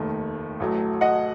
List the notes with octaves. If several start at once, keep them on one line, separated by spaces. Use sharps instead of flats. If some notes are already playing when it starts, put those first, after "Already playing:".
Already playing: F1 D#2 D#3 A3
A1 A2 F#3 A3
D#5 F#5